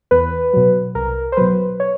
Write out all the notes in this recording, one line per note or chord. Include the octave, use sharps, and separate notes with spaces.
E2 B4
B2 F#3
C2 A#4
C5
B2 F#3 B4
C#5